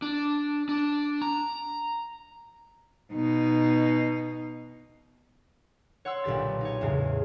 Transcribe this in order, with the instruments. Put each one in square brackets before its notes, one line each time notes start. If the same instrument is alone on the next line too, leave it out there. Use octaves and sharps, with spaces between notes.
[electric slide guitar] D4
D4
A#5
[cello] B2 D#4
[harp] C#5 F#5 C6 E6
B1 A#2 D3 G4 A6
D#4 C#5
E2 A2 C#3 G#3